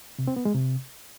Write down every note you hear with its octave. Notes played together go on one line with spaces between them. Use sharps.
C3
C4
B3
G#3
C3